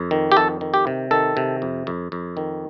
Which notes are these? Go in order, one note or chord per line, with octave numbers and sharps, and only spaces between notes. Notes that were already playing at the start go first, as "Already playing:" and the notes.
Already playing: F2
D#3
G4
F2 A4
D#3
G4
C3
D#3 A4
C3
F2
F2
F2
D#3